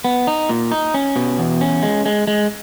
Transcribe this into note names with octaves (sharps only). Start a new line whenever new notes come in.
B3
D#4
A#2
D#4
C#4
B2
E2
C#4
G#3
G#3
G#3